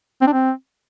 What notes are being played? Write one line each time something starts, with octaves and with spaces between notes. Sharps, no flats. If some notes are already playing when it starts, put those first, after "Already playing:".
C4
D4
C4